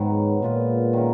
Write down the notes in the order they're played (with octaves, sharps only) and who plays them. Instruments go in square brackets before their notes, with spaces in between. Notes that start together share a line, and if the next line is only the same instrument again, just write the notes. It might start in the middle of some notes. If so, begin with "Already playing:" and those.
Already playing: [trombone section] G#2 [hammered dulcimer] D#3 F#3 B3 F#4
[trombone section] A#2 [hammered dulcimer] G#3 B3 F4 B4
[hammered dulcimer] D#3 A#3 C#4 F#4